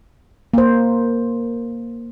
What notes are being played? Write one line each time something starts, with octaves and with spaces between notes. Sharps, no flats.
A#3 C5